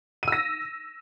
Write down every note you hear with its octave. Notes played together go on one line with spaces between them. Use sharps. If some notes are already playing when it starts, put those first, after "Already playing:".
E6 A#6 D#7